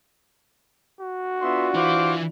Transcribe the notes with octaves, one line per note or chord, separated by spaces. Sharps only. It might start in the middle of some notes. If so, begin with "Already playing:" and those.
F#4
B3 D4 F4 E5 C6
E3 E4 C5 F5 D6